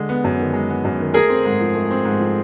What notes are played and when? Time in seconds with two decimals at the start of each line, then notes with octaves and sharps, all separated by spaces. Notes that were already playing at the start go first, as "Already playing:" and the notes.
Already playing: D3 G#3
0.09 B3
0.24 F#2
0.39 D#3
0.53 G#3
0.70 B3
0.85 F#2
1.00 D#3
1.14 A3 G#4 A#4
1.29 C4
1.45 G#2
1.60 F3
1.74 A3
1.91 C4
2.05 G#2
2.20 F3